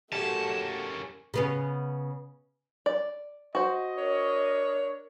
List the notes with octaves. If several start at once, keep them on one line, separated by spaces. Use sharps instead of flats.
A3 A#3 C#4 F#4 G4 A5
C#3 B3 C#4
D5
F#4 C5 D#5
D4 A#4 C#5